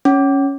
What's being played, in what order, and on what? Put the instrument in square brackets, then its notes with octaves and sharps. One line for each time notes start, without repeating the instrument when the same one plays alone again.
[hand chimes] C#4